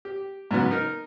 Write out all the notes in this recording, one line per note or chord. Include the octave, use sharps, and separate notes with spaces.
G4
G#2 C#3 F#3 B3
D#4 A#4